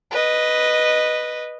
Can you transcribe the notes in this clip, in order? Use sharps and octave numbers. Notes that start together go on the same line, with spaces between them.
B4 D#5